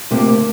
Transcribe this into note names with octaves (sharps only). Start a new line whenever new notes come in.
D2 C3 A#3 G4